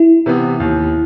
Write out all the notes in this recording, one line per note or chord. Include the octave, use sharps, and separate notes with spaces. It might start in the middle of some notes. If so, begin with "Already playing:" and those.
Already playing: E4
C3 E3 B3
D#2